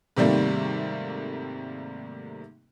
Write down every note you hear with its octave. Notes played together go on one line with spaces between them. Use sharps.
G#2 C3 D#3 G3 A3 A#3